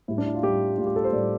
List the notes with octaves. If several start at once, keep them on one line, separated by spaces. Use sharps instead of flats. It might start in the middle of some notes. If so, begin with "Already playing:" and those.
A2 G3 E4
D4
E4
F4
A2 G3 G4
A2 G3 F4
G4
A4
C5
A2 G3 D5